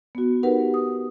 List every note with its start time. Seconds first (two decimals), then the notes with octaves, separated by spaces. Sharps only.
0.15 B3 F#4
0.43 D#4 G4 A#4 B4 F#5
0.74 D#6